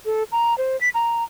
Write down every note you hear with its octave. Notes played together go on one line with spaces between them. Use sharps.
A4
A#5
C5
B6
A#5